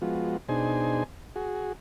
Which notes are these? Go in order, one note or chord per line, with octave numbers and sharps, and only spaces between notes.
F3 G#3 B3 F4 F#4
B2 D4 D#4 G#4 C5 G#5
F#4 G#4